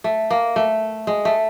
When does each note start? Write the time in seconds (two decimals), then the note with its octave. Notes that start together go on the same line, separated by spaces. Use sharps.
0.04 A3
0.31 A#3
0.56 A3
1.07 G#3
1.25 A3